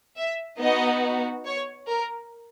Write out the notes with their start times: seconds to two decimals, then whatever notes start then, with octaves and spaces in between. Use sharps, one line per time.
0.16 E5
0.59 B3 D#4 F#4 D#5
1.45 C#5
1.88 A#4